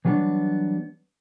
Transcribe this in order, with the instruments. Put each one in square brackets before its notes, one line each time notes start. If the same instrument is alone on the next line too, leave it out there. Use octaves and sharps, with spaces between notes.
[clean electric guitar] E3 F#3 G3 B3 D4